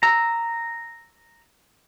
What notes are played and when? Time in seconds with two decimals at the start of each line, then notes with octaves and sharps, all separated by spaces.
0.03 A#5 E6